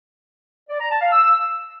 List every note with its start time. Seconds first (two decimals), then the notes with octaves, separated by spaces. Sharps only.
0.69 D5
0.80 A#5
0.91 A5
1.01 F5
1.12 E6